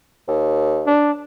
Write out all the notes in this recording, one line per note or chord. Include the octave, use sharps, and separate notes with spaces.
D#2
D4